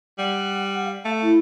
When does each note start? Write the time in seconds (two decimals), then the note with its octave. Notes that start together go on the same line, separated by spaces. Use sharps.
0.19 G3 F#5
0.85 F5
1.05 A3
1.22 E4